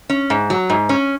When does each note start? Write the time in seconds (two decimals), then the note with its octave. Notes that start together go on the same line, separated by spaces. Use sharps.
0.10 C#4
0.30 G#2
0.50 F#3
0.70 G#2
0.89 C#4